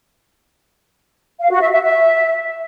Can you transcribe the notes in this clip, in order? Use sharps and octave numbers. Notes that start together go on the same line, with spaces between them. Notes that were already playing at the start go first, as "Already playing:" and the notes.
F5
F#4
E5
E5
E5